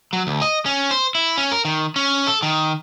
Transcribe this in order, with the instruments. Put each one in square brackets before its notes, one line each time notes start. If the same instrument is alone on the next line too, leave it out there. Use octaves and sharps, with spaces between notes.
[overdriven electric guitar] F#3
D2
D#5
C#4
C5
E4
C#4
A#4
D#3
C#4
A4
D#3